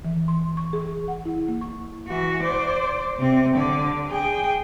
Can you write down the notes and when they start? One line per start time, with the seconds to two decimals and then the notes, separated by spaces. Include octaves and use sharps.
0.05 E3
0.28 C6
0.57 C#6
0.73 G#4
1.08 F#5
1.25 E4
1.48 A#3
1.61 C#6
2.08 E3 F#4
2.43 C5 D5
3.19 C3 C4
3.55 D3 D5
4.09 G#4 G5